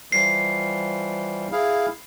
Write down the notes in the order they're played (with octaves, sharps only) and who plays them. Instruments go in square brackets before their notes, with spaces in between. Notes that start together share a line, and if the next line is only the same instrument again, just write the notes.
[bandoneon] E3 F3 G3 [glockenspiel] C7
[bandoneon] E4 G#4 F5